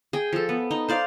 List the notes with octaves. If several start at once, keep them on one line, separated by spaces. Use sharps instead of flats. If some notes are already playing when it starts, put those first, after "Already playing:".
G#4 G5
F3 A4
B3
D#4
C5 D5 F5